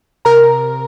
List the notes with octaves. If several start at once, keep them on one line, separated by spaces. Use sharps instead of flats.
C3 A#4 A#5